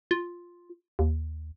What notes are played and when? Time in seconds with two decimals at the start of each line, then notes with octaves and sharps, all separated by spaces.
0.11 F4
0.99 D#2